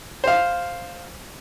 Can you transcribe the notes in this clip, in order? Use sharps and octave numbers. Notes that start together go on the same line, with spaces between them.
C5 F5